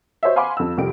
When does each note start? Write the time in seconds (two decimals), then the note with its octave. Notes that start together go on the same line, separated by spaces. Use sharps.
0.23 F#4 C5 C#5 D#5 E5
0.36 F5 F#5 G#5 B5 C6 D6
0.57 F2 E6
0.77 C2 F2 G4 D7